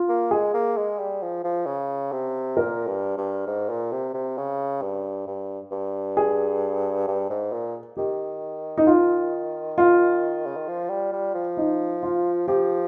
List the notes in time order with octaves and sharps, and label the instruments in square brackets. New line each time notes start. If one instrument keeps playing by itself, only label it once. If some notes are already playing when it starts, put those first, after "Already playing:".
Already playing: [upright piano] F4
[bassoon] A#3
[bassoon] G#3 [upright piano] G#4
[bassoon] A#3
G#3
G3
F3
F3
C#3
C3
[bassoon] A#2 [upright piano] A#4
[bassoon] G2
G2
G#2
A#2
C3
C3
C#3
G2
G2
G2
[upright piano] G#4
[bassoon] G2
G#2
A#2
[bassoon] D#3 [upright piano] G4
[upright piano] D#4
F4
F4
[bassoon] C#3
D#3
F3
G3
G3
F3
[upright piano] D#4
F4
[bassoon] F3 [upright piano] G4